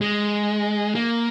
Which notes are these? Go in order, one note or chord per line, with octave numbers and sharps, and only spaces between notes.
G#3
A#3